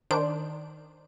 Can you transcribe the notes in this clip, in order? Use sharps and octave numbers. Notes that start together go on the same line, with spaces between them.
D#3 D4 C5 D7